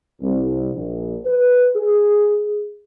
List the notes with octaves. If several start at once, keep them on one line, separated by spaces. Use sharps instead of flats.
C2
A#1
B4
G#4